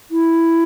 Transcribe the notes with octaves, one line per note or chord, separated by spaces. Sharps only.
E4